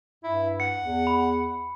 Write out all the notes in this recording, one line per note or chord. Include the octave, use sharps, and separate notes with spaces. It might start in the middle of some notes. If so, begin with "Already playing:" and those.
G2 E4
F#5 C#7
E2
B5